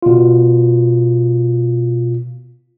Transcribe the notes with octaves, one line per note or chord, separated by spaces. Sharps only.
B2 F4